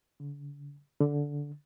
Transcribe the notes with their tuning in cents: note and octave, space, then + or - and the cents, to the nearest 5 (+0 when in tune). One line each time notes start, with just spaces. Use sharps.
D3 -45
D3 -15